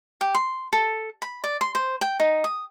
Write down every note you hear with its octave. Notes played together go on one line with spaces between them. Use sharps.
G4
C6
A4
B5
D5
C6
C5
G5
D#4
D#6